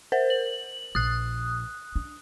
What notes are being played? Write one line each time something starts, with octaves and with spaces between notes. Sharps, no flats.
A#4 C5
F#7
A#1 D#6 F#6
D4